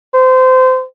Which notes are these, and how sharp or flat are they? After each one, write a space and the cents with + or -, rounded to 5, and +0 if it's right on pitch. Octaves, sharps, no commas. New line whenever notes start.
C5 -25